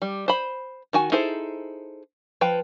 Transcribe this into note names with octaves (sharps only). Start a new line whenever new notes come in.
G3
C5 B5
D#3 F#4 G#5
D#4 E4 G#4 A4 C5
F3 B4 G5